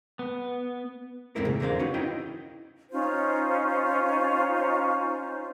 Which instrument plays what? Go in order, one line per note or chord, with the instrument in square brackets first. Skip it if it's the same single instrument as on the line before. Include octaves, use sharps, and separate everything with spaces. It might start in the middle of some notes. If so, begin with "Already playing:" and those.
[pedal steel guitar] B3
[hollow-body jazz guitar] E2 G#2 A3 C4 E4 A#4
C#3
E2 D3 A#4 C5 F5
C#4 D#4 F#4 B4
D#4 E4 D#5 G5
[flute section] C#4 D#4 F4 C5